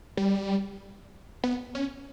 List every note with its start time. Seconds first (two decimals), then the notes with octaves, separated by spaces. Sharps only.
0.17 G3
1.44 B3
1.75 C#4